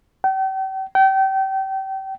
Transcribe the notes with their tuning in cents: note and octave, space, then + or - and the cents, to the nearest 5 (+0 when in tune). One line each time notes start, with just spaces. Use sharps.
G5 -40
G5 -30